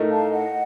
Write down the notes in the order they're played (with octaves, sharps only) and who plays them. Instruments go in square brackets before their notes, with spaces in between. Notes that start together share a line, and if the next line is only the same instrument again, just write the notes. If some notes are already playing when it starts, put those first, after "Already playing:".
Already playing: [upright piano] A2 A3 D#4 A#4
[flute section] F5 A5
D#5 F#5